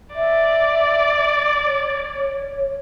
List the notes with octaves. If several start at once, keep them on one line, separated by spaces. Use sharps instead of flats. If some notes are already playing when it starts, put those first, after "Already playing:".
D5 E5
C#5